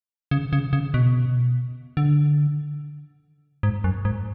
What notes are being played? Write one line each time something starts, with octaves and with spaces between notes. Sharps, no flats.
C#3
C#3
C#3
B2
D3
G#2
F#2
G#2